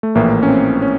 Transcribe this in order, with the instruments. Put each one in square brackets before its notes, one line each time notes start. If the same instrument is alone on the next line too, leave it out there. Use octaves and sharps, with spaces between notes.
[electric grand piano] A3
A#1 A2 E3 A#3
C#4
C4
C#4